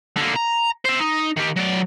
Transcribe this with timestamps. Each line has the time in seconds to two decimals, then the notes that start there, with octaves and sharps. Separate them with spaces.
0.17 D3 A#3
0.35 A#5
0.85 C5 E5
0.99 D#4
1.36 D#3 G4
1.56 F#3 D5